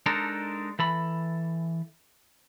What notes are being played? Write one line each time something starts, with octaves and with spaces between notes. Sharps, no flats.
G#3 D4 D#4 A4 A#4
E3 A4 B5